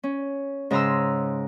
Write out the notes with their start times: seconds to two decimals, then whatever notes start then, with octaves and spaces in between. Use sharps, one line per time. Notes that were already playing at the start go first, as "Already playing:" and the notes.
0.03 C#4
0.71 G#2 C#3 G#4 A#5 C6 E6